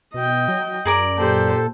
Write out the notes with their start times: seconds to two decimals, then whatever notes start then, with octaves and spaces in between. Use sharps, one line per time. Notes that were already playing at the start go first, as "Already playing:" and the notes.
0.14 B2 D#5 G5
0.48 F#3
0.85 F#2 G#4 A#4 D5
1.18 A#2 G4 A4 C5